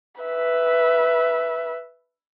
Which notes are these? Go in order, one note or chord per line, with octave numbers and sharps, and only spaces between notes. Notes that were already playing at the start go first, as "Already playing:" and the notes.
B4 E5